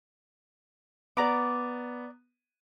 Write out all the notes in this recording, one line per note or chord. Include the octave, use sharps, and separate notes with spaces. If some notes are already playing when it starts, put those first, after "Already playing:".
B3 D5 A#5 D6